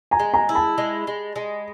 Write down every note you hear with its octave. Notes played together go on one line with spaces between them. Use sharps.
G#5 A#5
G#3
G#5 A#5
E4
A5 B5
G#3
G#3
G#3